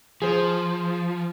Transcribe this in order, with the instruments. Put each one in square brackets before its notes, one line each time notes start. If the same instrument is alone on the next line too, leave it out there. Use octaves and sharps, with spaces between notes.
[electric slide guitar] F3 [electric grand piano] G#4 C5